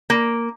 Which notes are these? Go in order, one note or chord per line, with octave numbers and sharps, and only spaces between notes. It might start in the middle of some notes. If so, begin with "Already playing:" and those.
A#3